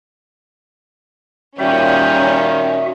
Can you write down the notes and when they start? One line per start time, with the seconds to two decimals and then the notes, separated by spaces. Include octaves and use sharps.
1.59 A#2 D#3 G3 C#4 F#4 E5